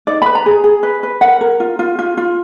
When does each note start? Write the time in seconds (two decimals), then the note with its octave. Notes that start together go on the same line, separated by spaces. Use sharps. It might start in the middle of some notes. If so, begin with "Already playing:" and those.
0.07 D#4 D5
0.22 B4 B5
0.35 A#5
0.46 G#4
0.64 G#4
0.83 B4
1.03 B4
1.21 A#4 F#5
1.41 A#4
1.60 F4
1.79 F4
1.99 F4
2.17 F4